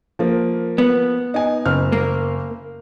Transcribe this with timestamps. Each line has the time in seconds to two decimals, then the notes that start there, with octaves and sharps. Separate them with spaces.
0.19 F3 A#3
0.78 B3
1.34 D#4 G#5
1.65 F#1 F6
1.92 A#3